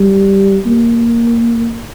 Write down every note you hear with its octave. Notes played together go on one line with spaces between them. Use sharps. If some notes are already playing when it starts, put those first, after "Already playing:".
Already playing: G3
A#3